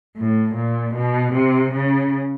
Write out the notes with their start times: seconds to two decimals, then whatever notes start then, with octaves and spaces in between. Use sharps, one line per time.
0.17 A2
0.55 A#2
0.94 B2
1.33 C3
1.72 C#3